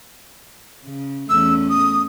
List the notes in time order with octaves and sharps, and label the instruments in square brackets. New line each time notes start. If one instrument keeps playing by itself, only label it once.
[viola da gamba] C#3
[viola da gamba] E2 A3 C#4 [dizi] E6
[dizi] D#6